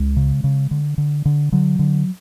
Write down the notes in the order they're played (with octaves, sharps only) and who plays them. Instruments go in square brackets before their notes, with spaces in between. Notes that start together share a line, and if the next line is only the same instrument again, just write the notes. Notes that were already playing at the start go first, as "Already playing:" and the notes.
Already playing: [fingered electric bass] C#2 G#3
C#3
C#3
D3
D3
D3
D3 F#3
D3